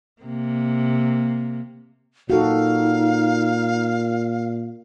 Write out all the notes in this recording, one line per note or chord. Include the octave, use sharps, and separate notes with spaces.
C3 A#3
A#2 D#4 F#4 A4 F5